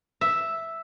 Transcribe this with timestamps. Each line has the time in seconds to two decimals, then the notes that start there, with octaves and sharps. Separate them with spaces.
0.21 E5